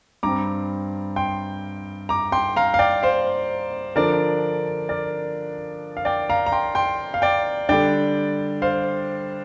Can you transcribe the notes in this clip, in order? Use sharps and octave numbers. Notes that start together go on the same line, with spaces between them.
G2 G3 C4 A#5 D6
G5 C6
A#5 D6
G5 C6
F5 A#5
F5
D5 G5
C5 F5
D3 F3 D4 A#4 D5
A#4 D5
F5
D5 G5
F5 A#5
A#5
G5 C6
G5 C6
F5
D5 G5
D3 G3 D4 D5 G5
C5 F5